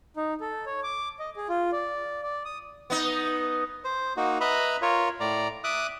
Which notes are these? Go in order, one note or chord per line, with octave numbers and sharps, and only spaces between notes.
D#4
A4
C#5
D6
D#5
G#4
F4
D5
D5
D#6
B3 D#4
C5
A#3 D#4 F#4
B4 D#5 E5 A#5 B5
F4 A#4 C#5
A2 D5 A#5
E5 D6 D#6 F#6